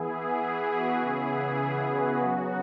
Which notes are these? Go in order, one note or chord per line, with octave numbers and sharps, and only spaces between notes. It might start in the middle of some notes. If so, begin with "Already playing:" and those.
Already playing: E3 B3 E4 G#4
E4 G#4
F#4
C#3 E3 B3 E4 G#4
F#4 B4
C#3 F#3 B3 F#4